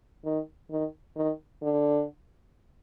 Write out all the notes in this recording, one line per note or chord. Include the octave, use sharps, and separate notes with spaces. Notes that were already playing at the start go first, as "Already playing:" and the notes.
D#3
D#3
D#3
D3